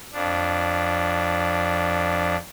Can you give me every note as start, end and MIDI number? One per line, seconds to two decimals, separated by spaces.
0.13 2.36 41
0.13 2.36 62